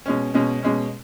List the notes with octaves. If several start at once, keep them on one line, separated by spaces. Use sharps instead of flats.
B2 G#3 C#4
B2 G#3 C#4
B2 G#3 C#4